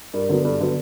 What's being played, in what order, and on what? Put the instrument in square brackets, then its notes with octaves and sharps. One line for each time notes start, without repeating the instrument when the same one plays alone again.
[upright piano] G2 [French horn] A#4
[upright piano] D3 F#3 B3
[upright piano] G2 [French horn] A4
[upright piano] D3 F#3 B3